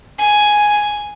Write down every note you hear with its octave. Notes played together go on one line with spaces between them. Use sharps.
G#5